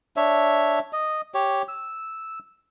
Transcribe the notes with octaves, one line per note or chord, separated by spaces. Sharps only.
D4 C#5 E5
D#5
G4 C#5
E6